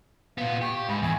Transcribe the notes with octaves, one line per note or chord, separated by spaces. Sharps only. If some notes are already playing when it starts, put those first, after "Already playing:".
A#2 B3 F5
G4 C#6
G#2 B5
E2 G#5